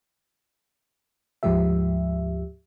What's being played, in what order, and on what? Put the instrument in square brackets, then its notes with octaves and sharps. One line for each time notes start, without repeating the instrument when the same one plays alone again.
[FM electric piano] D2 G#2 F3 G#3 G4 E5